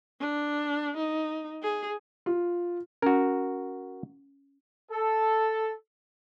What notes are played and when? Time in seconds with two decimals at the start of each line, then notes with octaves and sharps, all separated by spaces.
0.20 D4
0.97 D#4
1.63 G#4
2.26 F4
3.02 C#4 F#4 A#4
4.90 A4